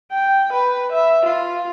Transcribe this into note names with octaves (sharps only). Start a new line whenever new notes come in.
G5
B4
E5
F4